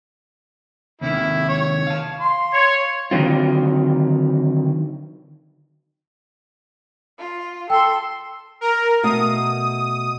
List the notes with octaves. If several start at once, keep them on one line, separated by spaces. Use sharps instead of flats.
D#2 C3 D#3 E4
C#5 C#6
F5 A5
C6
C#5
D3 D#3 F#3 C4 F4
F4
A4 G5 C6 E6
A#4
B2 A3 F5 D#6